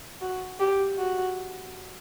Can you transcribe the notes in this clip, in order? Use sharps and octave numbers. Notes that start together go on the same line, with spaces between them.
F#4
G4
F#4